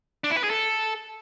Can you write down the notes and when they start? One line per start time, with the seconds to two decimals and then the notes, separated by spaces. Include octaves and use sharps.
0.24 D4
0.31 E4
0.37 B4
0.44 G#4
0.50 A4